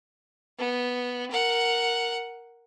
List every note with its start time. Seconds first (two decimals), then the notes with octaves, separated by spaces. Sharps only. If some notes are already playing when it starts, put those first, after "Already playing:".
0.58 B3
1.31 A#4 F#5